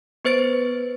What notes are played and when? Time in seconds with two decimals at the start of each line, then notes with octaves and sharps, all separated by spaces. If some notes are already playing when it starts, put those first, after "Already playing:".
0.25 B3 B4 C5 A6 D7